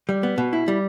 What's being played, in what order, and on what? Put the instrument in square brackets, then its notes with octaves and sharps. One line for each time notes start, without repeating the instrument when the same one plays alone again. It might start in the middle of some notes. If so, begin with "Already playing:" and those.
[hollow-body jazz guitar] G3
B3
B2
E4
G3